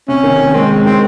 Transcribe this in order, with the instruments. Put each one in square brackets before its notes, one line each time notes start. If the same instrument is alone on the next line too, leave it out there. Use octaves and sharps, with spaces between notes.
[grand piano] C3 [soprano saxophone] C#4
[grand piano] D#3
D#3
[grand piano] G#3 [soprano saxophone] C4
[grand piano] G#3
[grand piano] D#3 [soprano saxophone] C4